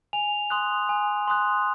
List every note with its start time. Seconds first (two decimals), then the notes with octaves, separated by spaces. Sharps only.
0.13 G#5 F7
0.50 C6 D#6 F#6
0.89 G#5
1.28 C6 D#6 F#6